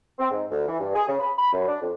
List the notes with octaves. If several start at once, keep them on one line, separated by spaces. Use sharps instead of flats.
C4
G#2
D2
E3
G2
G#4
C#3
B5
B5
F#2
D4
F2